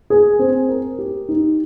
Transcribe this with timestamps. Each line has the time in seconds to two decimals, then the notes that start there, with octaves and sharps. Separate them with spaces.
0.10 G#4
0.39 C4
0.69 A#4
0.99 G4
1.29 D#4